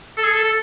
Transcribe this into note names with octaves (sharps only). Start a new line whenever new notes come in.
A4
G#4
A4
A4